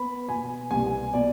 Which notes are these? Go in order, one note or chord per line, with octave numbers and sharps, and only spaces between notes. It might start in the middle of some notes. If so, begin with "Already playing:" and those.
Already playing: B3 B5
B2 G#5
C2 G#5
B2 D5